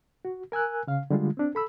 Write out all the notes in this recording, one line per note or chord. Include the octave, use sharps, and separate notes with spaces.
F#4
A#4 G#5 E6 F#6
C#3 F5
D3 G3 G#3 F4
C4 D4
A4 B5 E6